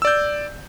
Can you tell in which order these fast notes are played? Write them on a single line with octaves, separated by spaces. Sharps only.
E6 D5 G6